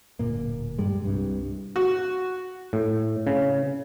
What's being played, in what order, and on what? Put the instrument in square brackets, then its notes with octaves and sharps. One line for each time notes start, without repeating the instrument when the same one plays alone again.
[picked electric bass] D1 A#2 A#3
D#1 G2 G3 G#3
C2 G2
[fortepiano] F#4
[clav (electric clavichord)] A2
C#3